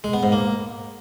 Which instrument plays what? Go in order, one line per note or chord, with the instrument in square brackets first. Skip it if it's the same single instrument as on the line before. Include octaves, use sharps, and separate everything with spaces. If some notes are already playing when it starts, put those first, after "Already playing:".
[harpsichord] G#3
B3
G#2
A#3